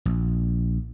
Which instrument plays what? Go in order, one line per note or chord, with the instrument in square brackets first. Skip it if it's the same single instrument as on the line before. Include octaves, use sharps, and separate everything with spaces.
[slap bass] A#1